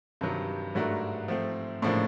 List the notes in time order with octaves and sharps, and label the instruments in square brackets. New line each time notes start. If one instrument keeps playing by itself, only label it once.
[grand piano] G2 [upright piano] C3 D#3 F#3
[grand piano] G#2 [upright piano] F#3 A3 D4 F#4 A#4
[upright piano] F3 A3 C4
[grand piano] A2 [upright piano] C#3 F3 A#3 D4